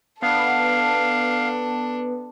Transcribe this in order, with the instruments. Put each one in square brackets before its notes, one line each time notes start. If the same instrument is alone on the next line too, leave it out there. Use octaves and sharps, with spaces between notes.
[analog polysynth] B3 [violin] D4 A4 [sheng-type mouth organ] F5